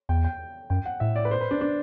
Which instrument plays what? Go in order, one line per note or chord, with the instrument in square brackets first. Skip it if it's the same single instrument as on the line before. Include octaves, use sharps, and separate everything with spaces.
[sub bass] E2 [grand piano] G5
[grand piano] G5
[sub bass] F#2 [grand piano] G5
[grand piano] F#5
[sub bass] A2 [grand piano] E5
[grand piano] D5
B4
C5
B4
D4
D4